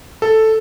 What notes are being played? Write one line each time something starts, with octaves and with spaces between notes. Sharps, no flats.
A4